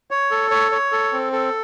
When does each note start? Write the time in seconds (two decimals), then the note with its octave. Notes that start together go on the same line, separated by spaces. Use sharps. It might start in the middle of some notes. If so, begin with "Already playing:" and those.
0.11 C#5
0.31 A4
0.51 C#5
0.71 C#5
0.92 A4
1.12 C4
1.33 A4